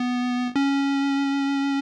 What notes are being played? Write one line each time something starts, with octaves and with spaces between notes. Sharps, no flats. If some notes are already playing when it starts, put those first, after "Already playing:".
Already playing: B3
C#4